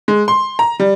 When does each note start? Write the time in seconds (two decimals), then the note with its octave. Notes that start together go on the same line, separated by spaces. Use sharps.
0.08 G#3
0.28 C6
0.59 A#5
0.80 G3